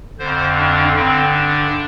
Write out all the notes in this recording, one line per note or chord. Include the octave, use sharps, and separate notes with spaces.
F2 D3 C5
D4
G2 D3 C4
D4